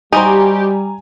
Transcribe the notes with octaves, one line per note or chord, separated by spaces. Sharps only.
G3 D#4 F#4 G4 C5 G#5 A#5